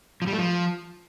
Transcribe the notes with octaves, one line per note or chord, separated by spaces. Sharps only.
F3
G3
A3
F3